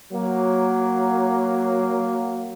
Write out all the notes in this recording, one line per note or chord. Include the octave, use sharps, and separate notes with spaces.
F#3 A#3